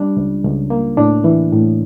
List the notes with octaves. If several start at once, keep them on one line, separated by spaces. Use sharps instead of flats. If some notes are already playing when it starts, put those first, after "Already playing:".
Already playing: G3 D4
C#2
C#2
A#3
A2 D4
E3
A2